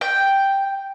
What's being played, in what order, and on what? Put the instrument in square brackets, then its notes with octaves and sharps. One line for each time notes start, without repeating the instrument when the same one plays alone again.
[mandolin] G5